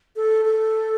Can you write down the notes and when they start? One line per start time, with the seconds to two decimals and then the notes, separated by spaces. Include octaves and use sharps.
0.16 A4
0.45 A4